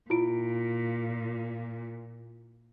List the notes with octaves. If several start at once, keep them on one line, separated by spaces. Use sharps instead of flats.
A#2 E4 F4 D7